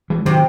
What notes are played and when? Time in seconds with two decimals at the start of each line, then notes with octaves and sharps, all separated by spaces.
0.10 E3 G#3
0.25 C3 D#3 F#3